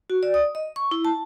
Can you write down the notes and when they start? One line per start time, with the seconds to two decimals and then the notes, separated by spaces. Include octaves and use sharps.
0.10 F#4
0.23 D5
0.34 D#6
0.55 D#5
0.76 C#6
0.91 E4
1.05 A5